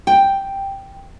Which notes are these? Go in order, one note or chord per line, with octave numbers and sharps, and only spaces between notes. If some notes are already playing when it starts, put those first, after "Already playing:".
G5